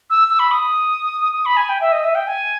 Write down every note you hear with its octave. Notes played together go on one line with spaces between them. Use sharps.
E6
E6
B5
D#6
D#6
B5
G#5
G5
E5
D#5
E5
G5
G#5